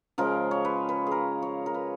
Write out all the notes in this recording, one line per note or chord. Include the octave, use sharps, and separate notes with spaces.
C#3 F3 G#3 A#4
C#5
B4
B4
G#4 A#4
C#5
A#4
B4